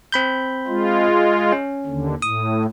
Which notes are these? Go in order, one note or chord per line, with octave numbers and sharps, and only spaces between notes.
C4 B5 G6
G#3 F4
C#4
D#2 D3
A2 D#6